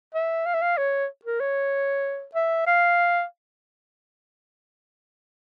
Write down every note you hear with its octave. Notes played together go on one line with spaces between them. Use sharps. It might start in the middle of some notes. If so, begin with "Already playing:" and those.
E5
F5
E5
F5
C#5
A#4
C#5
E5
F5